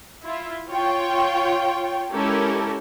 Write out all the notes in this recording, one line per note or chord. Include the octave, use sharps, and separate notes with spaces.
E4 F4 E5
F4 C#5 G5
G#3 C#4 E4 G4 A4 A#4